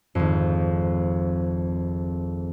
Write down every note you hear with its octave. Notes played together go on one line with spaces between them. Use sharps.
G#1 F2